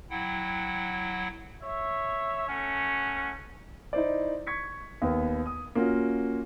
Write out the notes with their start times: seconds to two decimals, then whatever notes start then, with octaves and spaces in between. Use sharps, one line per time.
0.10 F#3 E4 F#5 G5
1.62 C#5 E5
2.48 A3 C#4 F#5
3.93 D#4 E4 C5 D5
4.47 C#6 G#6 B6 C#7
5.02 D#2 B3
5.46 D#6
5.75 A#3 C#4 F4 F#4